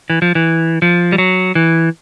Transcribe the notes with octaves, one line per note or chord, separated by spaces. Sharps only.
E3
F3
E3
F3
G3
F#3
E3